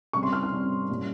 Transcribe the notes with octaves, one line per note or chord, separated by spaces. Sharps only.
C#3 G3 C4 C#6
C6
F6
F6
C#3 G3 C4
A#2 G3 C#4